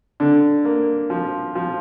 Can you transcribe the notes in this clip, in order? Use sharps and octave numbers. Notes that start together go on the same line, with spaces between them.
D3
A#3
F3
F3